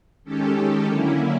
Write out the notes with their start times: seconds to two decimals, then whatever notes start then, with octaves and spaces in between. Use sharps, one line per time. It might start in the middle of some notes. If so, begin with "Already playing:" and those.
0.24 D#3 G#3 C#4 G4 A4
0.87 D3 F#3 A#3 C#4 E4